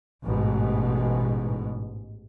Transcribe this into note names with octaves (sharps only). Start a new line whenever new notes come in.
A1 G#2 B2